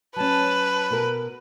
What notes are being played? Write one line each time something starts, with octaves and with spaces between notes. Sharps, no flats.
F#3 C#4 B4 A5
B2 A#4